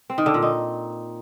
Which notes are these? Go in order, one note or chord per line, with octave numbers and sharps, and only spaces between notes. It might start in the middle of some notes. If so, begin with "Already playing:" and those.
C4
D#3
D3
A#2
D#4